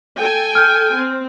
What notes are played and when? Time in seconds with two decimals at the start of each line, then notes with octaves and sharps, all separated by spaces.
0.17 A4 G5 G#5
0.55 F6 G6
0.97 C4